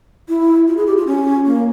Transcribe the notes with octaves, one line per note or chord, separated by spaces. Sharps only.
E4
F4
G#4
G4
F4
C#4
A#3